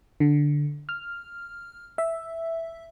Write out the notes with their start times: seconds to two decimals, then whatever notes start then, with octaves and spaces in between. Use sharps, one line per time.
0.20 D3
0.89 F6
1.98 E5